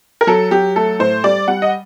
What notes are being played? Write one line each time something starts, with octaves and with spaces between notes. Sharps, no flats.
A#4
F#3 A4
F#3 G4
A3 A4
A2 C5
G3 D5
G3 F#5
D#5